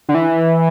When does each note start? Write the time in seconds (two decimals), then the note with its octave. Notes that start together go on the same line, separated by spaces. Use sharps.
0.09 D3
0.15 E3